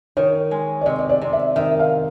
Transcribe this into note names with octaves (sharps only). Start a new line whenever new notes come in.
D#3 C#5
G#3
D5
C3 D#5
D#5
D5
C3
E5
D#3 E5
F5